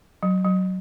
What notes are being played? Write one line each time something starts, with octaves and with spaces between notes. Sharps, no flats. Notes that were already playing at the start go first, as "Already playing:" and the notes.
F#3
F#3